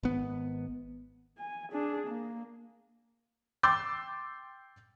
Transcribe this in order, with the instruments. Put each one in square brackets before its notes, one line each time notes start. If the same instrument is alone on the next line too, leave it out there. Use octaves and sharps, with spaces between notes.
[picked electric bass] G#1 B3
[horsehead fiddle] G#5
D4 G#4
A#3
[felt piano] G5 C6 D6 E6 G6 A6